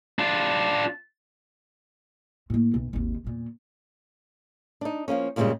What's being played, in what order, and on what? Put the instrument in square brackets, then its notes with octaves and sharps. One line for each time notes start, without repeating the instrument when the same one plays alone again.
[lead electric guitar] D4 F4
[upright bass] A2 A#3
B1
G#1 D#2
E2 A#2
[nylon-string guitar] D4 D#4
F3 G#3 A#3 C#4
G2 A#2 C#3 E3 G3 G#3